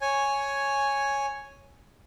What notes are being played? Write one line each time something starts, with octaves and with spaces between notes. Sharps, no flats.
C#5 G#5